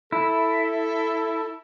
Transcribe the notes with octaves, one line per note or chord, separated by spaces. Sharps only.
E4 A4